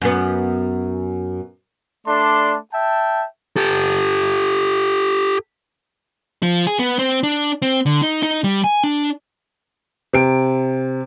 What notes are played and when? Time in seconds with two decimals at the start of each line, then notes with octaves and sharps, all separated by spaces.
0.02 F#2 B3
2.06 A3 D4 D5 A5 C6
2.73 E5 G5 A5
3.56 G4 A4
6.43 F3
6.67 G#4
6.79 B3
6.99 C4
7.23 D4
7.62 C4
7.86 D3
8.02 D#4
8.23 D#4
8.44 G3
8.64 G#5
8.84 D4
10.13 C3 D7